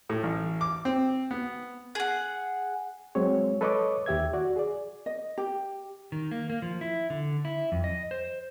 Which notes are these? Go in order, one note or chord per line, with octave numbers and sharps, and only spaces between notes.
A2
A1
D6
C4
B3
G#4 F#5
F#3 G#3 C4 C#5
A4 B4 C#5 D#5 C#6 D6
D#2 G4 E5 G#6
F#4 D5
G#4 D5
D#5
G4
D#3
A#3
A#3
F3
E4
D3
E4
F2
D#5
C5